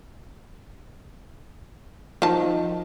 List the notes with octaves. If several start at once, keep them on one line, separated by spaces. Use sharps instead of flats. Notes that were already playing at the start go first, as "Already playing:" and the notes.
D#3 F3 A5